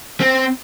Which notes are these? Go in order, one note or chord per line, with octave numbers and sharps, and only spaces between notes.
C4